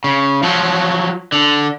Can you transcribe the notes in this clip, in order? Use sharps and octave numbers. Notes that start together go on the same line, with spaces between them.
C#3
F3 F#3
D3